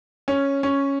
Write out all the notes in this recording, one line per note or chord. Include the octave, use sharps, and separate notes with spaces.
C#4
C#4